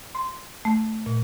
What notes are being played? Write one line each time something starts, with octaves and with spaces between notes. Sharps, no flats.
C6
A3
A#2